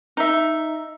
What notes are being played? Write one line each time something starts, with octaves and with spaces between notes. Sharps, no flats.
D#4 E5